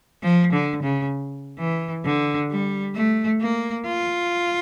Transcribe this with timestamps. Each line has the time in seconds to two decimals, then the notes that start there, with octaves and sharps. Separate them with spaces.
0.23 F3
0.53 D3
0.83 C#3
1.58 E3
2.05 D3
2.51 G3
2.95 A3
3.41 A#3
3.86 F4